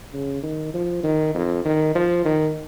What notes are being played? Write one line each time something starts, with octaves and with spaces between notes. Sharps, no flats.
C#3
D#3
F3
D#3
F2
D#3
F3
D#3